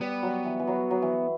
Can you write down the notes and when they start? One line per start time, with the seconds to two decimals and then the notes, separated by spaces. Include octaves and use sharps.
0.01 G3 B3
0.23 F#3
0.45 E3
0.60 E3
0.67 F#3
0.91 F#3
1.02 E3